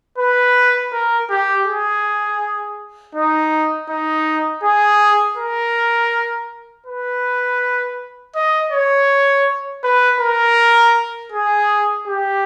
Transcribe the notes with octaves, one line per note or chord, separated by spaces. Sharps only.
B4
A#4
G4
G#4
D#4
D#4
G#4
A#4
B4
D#5
C#5
B4
A#4
G#4
G4